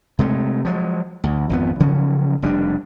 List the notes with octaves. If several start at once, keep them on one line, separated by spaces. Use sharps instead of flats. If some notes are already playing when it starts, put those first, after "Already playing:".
C3 G#3 A3
F3 F#3 G#3
D2
G#1 F2 B3
C#3 F3 F#3 C#4
F1 G3 C#4 D4